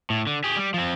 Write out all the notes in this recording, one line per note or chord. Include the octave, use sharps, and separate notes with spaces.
A2
D3
G4 G#4
G3
F3 C4